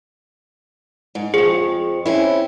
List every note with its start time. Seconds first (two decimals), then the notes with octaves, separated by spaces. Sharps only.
1.15 G#2
1.34 F2 F3 G#4
2.06 C4 C#4 E4